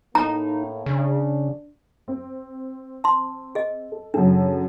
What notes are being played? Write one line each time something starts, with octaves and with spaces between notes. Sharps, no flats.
A2 A#3 D#4 A#5
C#3 D4
C4
A5 C6
G#4 D#5
A4
F#2 C#3 D4 A4